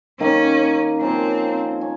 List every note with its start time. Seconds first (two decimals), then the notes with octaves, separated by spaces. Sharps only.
0.20 D#3 A#3 C#4 D#4 A#4
1.01 F3 A#3 C4 C#4
1.81 C#4